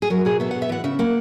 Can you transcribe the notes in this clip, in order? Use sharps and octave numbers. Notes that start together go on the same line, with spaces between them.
G#4
F#3 A#4
B2 G#4
B3 E5
B2 F#5
E5
E3 F#5
C#3 E5
A#3 F#5